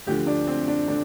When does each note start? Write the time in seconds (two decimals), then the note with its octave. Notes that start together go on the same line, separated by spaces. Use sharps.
0.07 D2 D3 F3 G4
0.27 D4
0.47 C4
0.68 D4
0.88 D3 D4